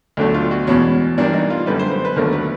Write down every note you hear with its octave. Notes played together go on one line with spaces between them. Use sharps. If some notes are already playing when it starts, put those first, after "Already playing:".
D2 D3 F#3 A3
F4
F#4
E2 B2 G#3 C#4
G2 E3 G3 A#3 D4
D#4
F4
F#2 D3 G3 B4
C5
C5
B4
D#2 D3 F#3 A3 A#4
B4